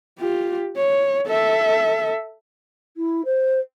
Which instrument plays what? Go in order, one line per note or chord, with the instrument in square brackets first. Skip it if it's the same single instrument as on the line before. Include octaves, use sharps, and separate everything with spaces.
[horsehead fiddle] F4 G4
C#5
A4 E5
[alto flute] E4
C5